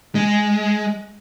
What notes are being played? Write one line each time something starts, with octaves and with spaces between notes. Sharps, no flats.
G#3